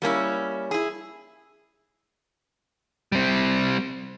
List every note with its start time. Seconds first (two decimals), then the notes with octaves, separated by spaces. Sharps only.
0.02 G3 A#3 C#4 E4
0.71 E4 G#4
3.12 G3 C4